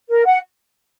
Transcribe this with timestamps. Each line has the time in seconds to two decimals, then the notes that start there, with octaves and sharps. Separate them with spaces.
0.09 A#4
0.25 F#5